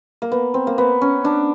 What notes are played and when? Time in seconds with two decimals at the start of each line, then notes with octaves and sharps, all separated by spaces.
0.22 A#3
0.32 B3
0.54 C4
0.67 A#3
0.78 B3
1.02 C#4
1.25 D4